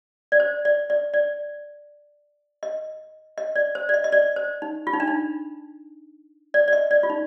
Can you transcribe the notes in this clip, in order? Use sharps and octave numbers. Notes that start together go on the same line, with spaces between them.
D5
C5
D5
D5
D5
D#5
D#5
D5
C5
D5
D#5
D#5
D5
C5
D#4
F4
D#4
D4
D#4
D5
D5
D#5
D5
F4
D#4